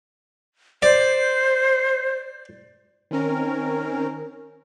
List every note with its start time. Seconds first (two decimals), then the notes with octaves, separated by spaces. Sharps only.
0.82 C5 D5
3.11 D#3 C4 C#4 A#4